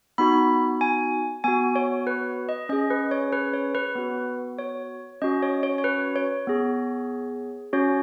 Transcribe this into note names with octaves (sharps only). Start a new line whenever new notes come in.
B3 D#4 F#4 B5
G#5
B3 F#4 G#5
C#5
B4
D#5
C#4 G#4 D#5
B4
C#5
B4
C#5
B4
B3 F#4
C#5
C#4 F#4 D#5
C#5
C#5
C#5
B4
C#5
B3 G#4
C#4 F#4 C#5